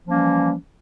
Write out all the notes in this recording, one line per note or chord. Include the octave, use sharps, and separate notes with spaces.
E3 F3 G3 A#3 C#4